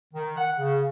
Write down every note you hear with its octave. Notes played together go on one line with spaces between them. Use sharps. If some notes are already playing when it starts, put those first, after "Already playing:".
D#3
F#5
C#3